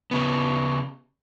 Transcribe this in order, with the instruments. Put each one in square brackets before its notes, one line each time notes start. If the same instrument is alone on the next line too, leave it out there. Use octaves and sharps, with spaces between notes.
[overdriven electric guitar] C#3 B3